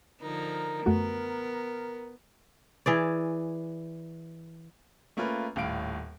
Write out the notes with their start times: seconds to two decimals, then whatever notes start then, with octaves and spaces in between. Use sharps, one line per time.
0.21 D3 F3 D#4 A#4
0.86 F#2 A3 B3 F#4
2.86 E3 G#4 D5
5.17 A3 A#3 C#4 F4 B4
5.56 D#1 A2 F5 D7